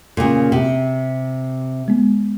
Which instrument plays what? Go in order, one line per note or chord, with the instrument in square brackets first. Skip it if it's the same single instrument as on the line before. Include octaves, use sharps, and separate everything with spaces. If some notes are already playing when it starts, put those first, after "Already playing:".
[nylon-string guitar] A#2 C#3
C3
[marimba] G#3 B3